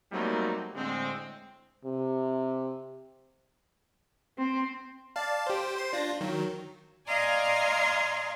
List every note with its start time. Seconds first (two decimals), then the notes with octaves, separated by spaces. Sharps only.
0.12 F#3 G3 A3 A#3 C4 D#4
0.75 A2 D3 G#3 A3 C4
1.85 C3
4.38 C4
5.16 D5 F5 A5
5.47 G4 C5
5.76 C5 C6
5.93 D4 F4 A#6
6.21 D#3 F#3
7.07 D5 D#5 F5 G#5 A#5 C6